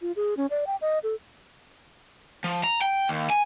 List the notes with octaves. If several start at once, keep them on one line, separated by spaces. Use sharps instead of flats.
F4
G#4
C#4
D5
G5
D#5
A4
F3
A#5
G5
D#2
G#5